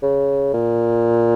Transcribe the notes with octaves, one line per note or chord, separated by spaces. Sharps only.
C#3
A#2